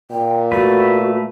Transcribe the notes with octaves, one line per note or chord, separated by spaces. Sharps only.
A#2 G5
A3 F#4 B4